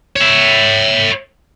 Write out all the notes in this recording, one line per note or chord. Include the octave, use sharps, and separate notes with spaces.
C#5 E5